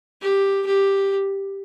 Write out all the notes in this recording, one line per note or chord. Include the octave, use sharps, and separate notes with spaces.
G4
G4